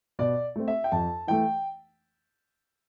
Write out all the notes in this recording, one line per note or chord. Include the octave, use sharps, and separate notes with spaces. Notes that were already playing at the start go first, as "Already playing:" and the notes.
B2 D5
A3 C4
E5
G5
F2 A5
E3 A3 G5